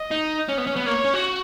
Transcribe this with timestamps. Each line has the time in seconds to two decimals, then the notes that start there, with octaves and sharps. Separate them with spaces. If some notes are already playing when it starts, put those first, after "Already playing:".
Already playing: D#5
0.11 D#4
0.48 C#4
0.58 B3
0.67 C#4
0.76 B3
0.86 A#3 C#5
1.04 C#4
1.14 F#4